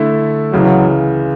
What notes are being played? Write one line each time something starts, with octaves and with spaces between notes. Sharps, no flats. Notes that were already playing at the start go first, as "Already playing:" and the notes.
Already playing: D3 A3 E4
C#2 C#3 E3 F#3